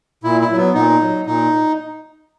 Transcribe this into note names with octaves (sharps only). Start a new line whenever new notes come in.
A#2 E4
E4
F#3
B3
A#2 D#4
F#3
A#2 D#4